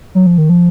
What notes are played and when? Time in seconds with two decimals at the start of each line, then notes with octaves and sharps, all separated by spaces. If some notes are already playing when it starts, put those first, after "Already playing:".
0.15 F#3
0.26 F3
0.38 D#3
0.49 F3